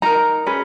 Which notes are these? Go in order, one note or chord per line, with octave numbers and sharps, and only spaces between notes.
D#4 A#4 A#5
C#4 G#4 B4